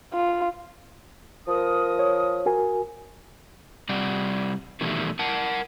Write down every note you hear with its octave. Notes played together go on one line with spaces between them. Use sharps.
F4
F3 A#4 D#6
C#5
F#4 A#4 G#5
C3 G3 D5 F#5
B2 D#3 E3 G3 A3
A#4 F#5 A5